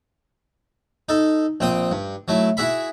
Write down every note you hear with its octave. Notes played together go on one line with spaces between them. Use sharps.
D#4 A4
A#1 C4 G5 D#6
G2
F#3 A3 E4
E4 F#4 G#4 E5 B5